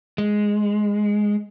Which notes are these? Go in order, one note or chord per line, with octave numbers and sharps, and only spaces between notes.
G#3